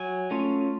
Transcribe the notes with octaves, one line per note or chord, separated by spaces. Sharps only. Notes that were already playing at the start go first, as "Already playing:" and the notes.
Already playing: F#3 G#5
A3 C#4 F4